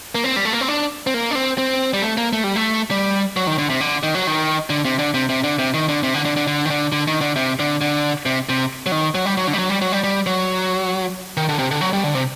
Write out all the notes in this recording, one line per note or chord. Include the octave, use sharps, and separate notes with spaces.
A#3
C4
G3
A3
A#3
C4
D4
C4
A#3
D4
C4
C4
G3
A3
A#3
A3
G3
A3
G3
F#3
D#3
D3
C3
D3
D#3
F#3
D#3
D3
C3
D3
C3
C3
D3
C3
D#3
D3
C3
D3
D3
D3
D3
D#3
D3
D3
D#3
D3
C3
D3
D3
C3
C3
F#3
D#3
F#3
G3
F#3
D3
G3
F#3
G3
F#3
G3
G3
F#3
D#3
D3
C3
D3
F#3
G3
D3
C3